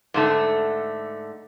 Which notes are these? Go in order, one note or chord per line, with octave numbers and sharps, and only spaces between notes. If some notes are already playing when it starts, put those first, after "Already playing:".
G#2 D3 A3